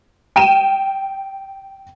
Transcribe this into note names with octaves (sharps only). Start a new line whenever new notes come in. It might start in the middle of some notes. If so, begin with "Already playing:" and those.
G5 D#7 E7